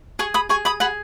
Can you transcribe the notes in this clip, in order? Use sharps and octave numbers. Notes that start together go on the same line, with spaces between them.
G#4 G#5 C#6
B5 D#6
G#4 G#5 C#6
B5 D#6
G#4 F#5 B5